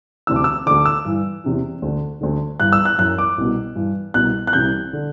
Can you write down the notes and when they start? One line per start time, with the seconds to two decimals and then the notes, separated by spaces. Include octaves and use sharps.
0.27 D2 C3 E3 E6
0.36 D6
0.44 E6
0.66 D2 D3 D6
0.85 E6
1.05 G2 E3
1.44 E2 C3 E3
1.82 D2 D3
2.21 D2 D3
2.60 G2 E3 F#6
2.73 E6
2.85 F#6
2.98 F#2 E3 F#6
3.18 D6
3.38 C2 B2
3.76 G2 E3
4.14 C2 B2 F#6
4.47 F#6
4.53 C2 C3 E3 G6
4.93 D3